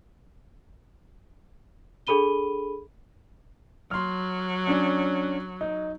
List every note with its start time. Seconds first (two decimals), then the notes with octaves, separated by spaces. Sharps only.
2.07 D4 G#4 A4 B5 D#7 G7
3.91 F#3 C6 F6
4.67 C#4 D4
5.61 D#4